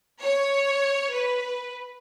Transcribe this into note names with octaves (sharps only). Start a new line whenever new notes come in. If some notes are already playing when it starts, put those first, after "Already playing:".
C#5
B4